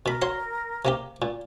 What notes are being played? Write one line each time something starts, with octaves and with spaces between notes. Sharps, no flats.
B2 A#4 B5
F#4 C#5 C6
C3 A#3 G4
A#2